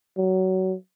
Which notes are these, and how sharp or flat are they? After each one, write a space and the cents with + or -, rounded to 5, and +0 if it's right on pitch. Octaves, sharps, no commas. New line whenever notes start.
F#3 +20